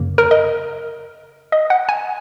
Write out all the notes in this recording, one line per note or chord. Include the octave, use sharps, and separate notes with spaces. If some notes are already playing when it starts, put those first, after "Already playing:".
Already playing: F#2 C#3 A#3
A#4
D#5
D#5
F#5
G#5